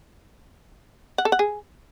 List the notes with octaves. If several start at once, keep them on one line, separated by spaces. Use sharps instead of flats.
F#5
A4
F#5
G#4